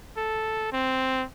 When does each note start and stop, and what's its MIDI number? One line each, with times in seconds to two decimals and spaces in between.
0.17 0.72 69
0.73 1.24 60